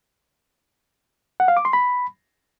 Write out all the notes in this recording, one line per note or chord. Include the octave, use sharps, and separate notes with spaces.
F#5
F5
D6
C6
B5